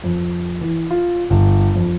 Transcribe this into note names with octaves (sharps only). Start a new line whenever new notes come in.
F2
E3
F4
G1
F2